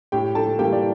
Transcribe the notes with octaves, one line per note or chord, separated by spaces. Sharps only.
A2 G4 G5
A4 A5
E3 G3 A#3 G4 G5
D5